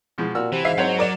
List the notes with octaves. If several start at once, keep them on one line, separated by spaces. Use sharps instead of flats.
B2 F3 G#3
A#2 F#4 E6 F6
C3 E3
G#2 E5 F5 C7
F#3 C4 C5 C#5 F#5
A#4 D5 E7